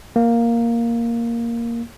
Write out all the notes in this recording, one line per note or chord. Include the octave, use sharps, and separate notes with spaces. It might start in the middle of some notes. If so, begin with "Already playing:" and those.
A#3